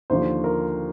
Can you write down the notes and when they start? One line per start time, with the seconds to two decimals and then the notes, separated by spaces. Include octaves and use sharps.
0.10 D#2 D3 F3 C5
0.44 A#4